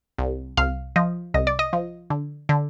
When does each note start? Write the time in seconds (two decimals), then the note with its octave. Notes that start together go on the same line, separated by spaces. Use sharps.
0.18 C2
0.57 C2 F5
0.96 F3 D#5
1.34 C2 D#5
1.47 D5
1.59 D#5
1.73 F3
2.10 D3
2.49 D3